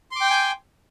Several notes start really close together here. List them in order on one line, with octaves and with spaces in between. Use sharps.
C6 D6 G5 G6 G#5